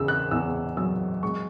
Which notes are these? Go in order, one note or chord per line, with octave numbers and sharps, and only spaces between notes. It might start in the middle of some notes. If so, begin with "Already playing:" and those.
Already playing: E2 C#3 E6
F#6
E2 E6
F#3 E6
G#3 C#6